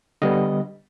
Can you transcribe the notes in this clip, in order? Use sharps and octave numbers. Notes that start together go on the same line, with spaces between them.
D3 G3 B3 D#5